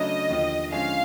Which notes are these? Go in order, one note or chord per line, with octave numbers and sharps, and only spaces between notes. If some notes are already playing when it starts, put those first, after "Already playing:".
Already playing: C#3 F#3 A3 D4 D#5
D#2 D3 F3
D3 F3 G#3 C#4 F4 F5